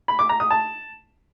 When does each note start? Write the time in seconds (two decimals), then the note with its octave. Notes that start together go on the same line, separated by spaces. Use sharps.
0.08 B5
0.19 D6
0.29 A#5
0.40 D#6
0.51 A5